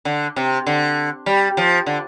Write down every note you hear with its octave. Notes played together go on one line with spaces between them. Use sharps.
D3
C3
D3
G3
F3
D3